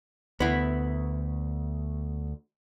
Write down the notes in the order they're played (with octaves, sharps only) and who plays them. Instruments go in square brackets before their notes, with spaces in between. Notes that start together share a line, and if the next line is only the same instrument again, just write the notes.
[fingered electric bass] D2 [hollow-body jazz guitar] B3 E4